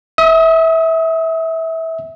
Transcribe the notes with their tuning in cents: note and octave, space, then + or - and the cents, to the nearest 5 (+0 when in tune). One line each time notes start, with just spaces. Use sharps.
E5 -20 D#6 +30